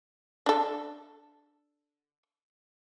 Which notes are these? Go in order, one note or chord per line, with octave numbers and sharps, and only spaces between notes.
D4 A4